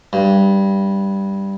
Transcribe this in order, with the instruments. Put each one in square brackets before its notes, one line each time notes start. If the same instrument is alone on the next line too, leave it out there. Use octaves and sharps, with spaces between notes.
[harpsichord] G2